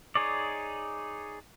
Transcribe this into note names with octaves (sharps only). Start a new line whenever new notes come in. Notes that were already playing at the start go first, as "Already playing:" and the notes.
D#4 G#4 C#5 D5